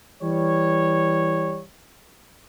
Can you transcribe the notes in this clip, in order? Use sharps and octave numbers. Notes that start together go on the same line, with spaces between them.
E3 G3 C#5